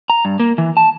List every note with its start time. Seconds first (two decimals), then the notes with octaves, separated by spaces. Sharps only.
0.10 A#5
0.25 G2
0.40 A#3
0.58 E3
0.77 A5